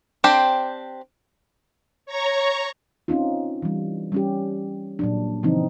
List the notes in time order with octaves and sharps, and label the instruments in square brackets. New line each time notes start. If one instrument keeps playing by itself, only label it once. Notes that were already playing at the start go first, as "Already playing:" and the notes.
[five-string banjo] C4 D4 G4 C5
[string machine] C#5 A#5 C#6
[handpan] C4 C#4 D#4 F4
E3 G3
G3 C#4 G4
A#2 F#3 D4
C#3 E3 F3 C4 D#4